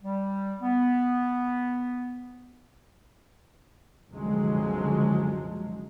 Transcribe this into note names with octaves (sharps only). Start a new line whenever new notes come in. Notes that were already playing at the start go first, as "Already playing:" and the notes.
G3
B3
F#1 C2 D3 F3 F#3 G#3